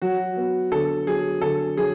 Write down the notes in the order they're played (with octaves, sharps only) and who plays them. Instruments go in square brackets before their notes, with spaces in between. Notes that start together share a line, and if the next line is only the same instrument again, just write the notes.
[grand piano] F#3 [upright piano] F#4
[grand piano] B3
[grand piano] D3 [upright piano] A4
[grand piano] F#3 [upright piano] G#4
[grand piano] D3 [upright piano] A4
[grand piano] F#3 [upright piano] G#4